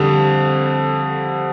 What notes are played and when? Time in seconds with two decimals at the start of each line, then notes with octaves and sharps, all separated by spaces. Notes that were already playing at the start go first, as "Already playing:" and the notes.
Already playing: F2 D3 G3